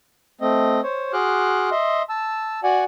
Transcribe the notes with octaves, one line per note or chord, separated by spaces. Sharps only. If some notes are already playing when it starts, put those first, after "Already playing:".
A3 C4 D#5
C5 C#5
F#4 G#4 C6 D6 F6 F#6
D#5 E5 C6
A5 E6
F#4 D5 F#5 G#5